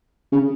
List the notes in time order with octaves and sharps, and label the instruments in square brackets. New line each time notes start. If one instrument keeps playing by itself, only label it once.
[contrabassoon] C#3